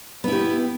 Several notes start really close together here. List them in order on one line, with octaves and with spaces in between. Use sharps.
B3 E4 G4